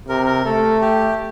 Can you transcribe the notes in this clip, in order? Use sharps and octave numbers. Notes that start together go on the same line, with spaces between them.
C3 A#4
A#4
A3 A4
G4